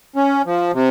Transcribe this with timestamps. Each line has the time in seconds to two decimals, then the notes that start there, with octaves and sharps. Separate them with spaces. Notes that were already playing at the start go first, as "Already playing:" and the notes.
0.16 C#4
0.46 F3
0.74 C3